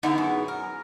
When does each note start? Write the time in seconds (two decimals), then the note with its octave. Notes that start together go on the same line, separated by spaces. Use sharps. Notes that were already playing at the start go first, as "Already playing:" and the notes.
0.03 D3 B3 D#4 E4 G#4
0.18 F#2
0.48 A#4